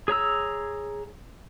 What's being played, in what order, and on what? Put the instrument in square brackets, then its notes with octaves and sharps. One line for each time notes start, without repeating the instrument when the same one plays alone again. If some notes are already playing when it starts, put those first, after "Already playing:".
[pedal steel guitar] G#4 C#5 A#5 E6